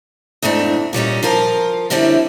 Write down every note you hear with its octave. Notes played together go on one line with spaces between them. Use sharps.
E2 G#2 A3 C4 D4
A#2 G3 C#4 D#4
F3 F4 A#4
F#2 D3 G3 C4 C#4 E4